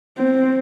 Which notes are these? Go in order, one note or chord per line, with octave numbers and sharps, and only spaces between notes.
C4